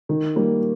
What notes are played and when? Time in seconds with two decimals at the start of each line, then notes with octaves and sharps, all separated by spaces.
0.09 D#3
0.36 G3 A#3